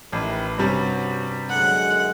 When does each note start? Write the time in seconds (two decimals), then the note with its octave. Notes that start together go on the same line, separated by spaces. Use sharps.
0.12 A1 D#3 E4 B4
0.58 G2 C3 G3 C#4 F#4
1.49 F#2 D3 G#3 F#5